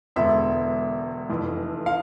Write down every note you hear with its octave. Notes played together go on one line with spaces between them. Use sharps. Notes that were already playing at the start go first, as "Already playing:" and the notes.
E1 E2 D3 G#3 B3 E5
F1 F2 E3
F5